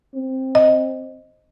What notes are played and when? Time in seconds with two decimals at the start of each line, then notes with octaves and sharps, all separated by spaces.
0.15 C4
0.55 D#5